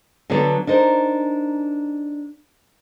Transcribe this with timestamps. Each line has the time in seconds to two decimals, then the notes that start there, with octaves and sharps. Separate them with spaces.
0.30 D3 F#3 B3 A4 D5
0.67 D4 D#4 A#4 C5